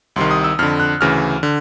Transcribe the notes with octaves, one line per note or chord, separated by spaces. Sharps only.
C2 C3 D#3 C6
D#6
E6
F2 D3 F6
F#6
D2 C#3 E3 F6
D3